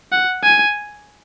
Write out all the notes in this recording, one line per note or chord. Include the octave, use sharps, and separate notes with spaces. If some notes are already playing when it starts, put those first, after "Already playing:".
F#5
G#5